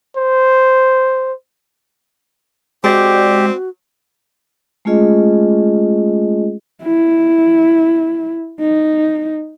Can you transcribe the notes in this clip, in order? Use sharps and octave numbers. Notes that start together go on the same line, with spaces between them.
C5
G#3 C4 F#4 G4 D5
G#3 A3 C#4 F4 G#4 D#5
E4
D#4